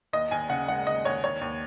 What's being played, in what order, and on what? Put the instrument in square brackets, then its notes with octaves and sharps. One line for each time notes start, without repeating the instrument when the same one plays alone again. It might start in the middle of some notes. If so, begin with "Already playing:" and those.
[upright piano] D#2 D#5
D#2 G#5
C#3 F#5
G#3 F#5
D#2 D#5
D#2 C#5
D#2 C#5
D#2